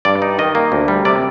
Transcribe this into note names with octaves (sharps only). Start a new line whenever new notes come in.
G2 D5
D#4
D#3 D#5
A#3
D2
G3
C3 D5